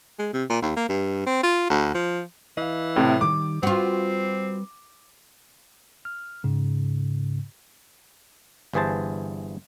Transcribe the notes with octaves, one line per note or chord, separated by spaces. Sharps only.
G#3
C3
A#2
D#2
A#3
G2
C4
F4
D2
F3
E3 D#5 F5
A2 C3
D#3 G3 D6
G3 C4 F4 F#4 B4
F6
G#2 C#3
G1 G2 E3 G#4 C5 A5